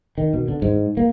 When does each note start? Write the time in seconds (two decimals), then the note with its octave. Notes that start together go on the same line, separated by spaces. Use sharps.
0.18 D#3
0.34 B2
0.48 D3
0.62 G#2
0.97 A#3